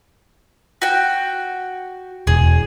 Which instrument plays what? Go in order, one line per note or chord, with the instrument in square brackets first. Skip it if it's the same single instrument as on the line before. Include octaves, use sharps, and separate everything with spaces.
[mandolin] F#4 G5
[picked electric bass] E1 [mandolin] G#4